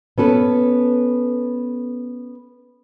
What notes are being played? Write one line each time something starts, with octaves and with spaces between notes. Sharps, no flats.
B3 C#4 A4 B4